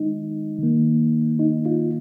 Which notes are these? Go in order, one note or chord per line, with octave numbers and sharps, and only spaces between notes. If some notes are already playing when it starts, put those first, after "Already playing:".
Already playing: D#3 G#3 D#4
D#3 A#3
D#4
F4